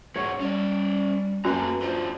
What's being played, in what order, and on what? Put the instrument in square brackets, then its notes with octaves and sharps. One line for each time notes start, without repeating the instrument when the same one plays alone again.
[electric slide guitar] G#2 F#3 G#3 [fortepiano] C#5 [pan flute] F#5
[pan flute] G3 [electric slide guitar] C#4 D5
[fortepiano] F#2 [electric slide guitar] A#3 A4 A#5 [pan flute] B4
[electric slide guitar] F2 D4 C5 [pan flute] F4